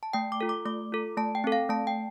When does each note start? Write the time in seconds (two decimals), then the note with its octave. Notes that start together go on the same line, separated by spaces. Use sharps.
0.03 A5
0.13 A3 G5
0.32 D6
0.41 F4 A4
0.49 D6
0.66 A3 D6
0.92 F4 A4
1.17 A3 A5
1.35 G5
1.44 C4 A4
1.52 F5
1.69 A3 A5
1.87 G5